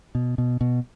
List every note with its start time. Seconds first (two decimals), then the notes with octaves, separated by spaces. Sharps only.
0.15 B2
0.38 B2
0.61 B2